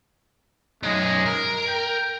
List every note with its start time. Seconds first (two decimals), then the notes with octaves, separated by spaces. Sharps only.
0.83 F#2 G#3 D#4
1.26 A#4
1.68 G5